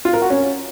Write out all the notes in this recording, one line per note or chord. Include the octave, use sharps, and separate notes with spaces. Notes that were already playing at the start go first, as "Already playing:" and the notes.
F4
A#4
F#4
C#4